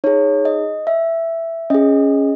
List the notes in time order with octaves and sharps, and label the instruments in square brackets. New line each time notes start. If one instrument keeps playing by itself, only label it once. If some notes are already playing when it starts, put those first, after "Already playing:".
[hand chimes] D#4 G#4 C#5
D#5
E5
C#4 G#4 D#5